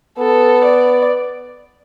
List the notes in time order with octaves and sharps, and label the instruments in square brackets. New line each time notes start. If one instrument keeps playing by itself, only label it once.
[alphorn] B3 [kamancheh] A4
[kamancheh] D5